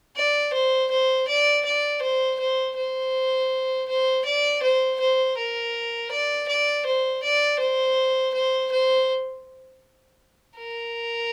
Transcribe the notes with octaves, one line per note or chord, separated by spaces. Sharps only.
D5
C5
C5
D5
D5
C5
C5
C5
C5
D5
C5
C5
A#4
D5
D5
C5
D5
C5
C5
C5
A#4